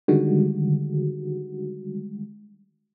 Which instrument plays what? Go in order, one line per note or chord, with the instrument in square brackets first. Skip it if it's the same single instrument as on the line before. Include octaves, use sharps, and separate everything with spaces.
[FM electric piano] D3 D#3 G3 G#3 F#4